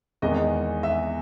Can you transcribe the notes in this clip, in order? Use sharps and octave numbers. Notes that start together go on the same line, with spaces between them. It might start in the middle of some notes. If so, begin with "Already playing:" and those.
E2 D#3 G#3 B3 D#5
E5